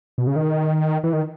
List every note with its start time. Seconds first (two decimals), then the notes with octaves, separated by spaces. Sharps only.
0.18 B2
0.27 C#3
0.36 D#3
1.04 E3
1.13 D#3